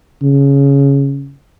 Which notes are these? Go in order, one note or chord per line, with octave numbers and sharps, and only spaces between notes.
C#3